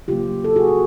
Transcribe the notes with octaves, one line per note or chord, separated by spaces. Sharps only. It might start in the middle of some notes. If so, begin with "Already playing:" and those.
C#3 F#3 A#3 F4 G4
A4
F#4 G#4